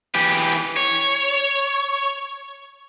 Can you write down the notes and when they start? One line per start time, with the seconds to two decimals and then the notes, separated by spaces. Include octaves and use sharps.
0.14 E3 G4
0.76 C#5